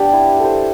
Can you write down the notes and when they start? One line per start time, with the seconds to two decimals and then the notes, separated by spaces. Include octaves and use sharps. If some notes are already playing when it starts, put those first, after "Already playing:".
Already playing: B3 D4 G4 D5
0.13 E4
0.40 A4 C5